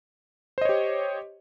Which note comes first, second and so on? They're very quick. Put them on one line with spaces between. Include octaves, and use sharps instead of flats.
C5 D#5 C#5 G4